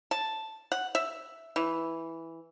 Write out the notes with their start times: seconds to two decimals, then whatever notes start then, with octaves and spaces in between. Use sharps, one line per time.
0.11 A5
0.72 F#5
0.95 E5
1.56 E3